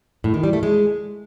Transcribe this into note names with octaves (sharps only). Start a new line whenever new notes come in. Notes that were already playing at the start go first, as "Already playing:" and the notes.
A2
D#3
G3
A3
G#3